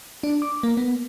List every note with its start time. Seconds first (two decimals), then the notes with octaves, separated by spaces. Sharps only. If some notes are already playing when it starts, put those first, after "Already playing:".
0.23 D4
0.42 D6
0.63 A#3
0.77 B3